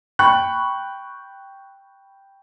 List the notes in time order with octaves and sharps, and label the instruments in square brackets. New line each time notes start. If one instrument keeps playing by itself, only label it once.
[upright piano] G5 B5 C#6 F#6